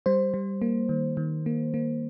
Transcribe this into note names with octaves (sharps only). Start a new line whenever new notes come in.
G3 C5
G3
A#3
D#3
D#3
A#3
A#3